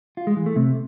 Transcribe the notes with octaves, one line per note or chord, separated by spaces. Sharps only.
F4
G#3
E3
A3
C3